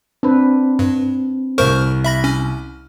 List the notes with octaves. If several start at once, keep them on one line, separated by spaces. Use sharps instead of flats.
C4 D4 B4
G2
C2 A#4 C5 C#6 F6
E5 B5 A#6
C#4